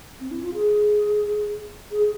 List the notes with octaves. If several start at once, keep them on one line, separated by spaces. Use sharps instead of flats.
C4
E4
F4
G#4
G#4